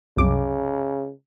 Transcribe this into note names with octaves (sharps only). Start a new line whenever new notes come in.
C2 F#2 C#3 D6